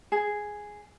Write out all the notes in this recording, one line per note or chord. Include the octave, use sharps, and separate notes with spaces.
G#4